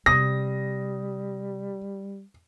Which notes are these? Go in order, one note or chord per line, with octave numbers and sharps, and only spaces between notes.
C3 G3 D#6 A#6